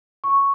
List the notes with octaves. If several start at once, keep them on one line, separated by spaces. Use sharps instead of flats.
C#6